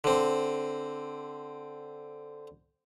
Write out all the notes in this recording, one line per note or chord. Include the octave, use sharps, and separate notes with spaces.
D3 C4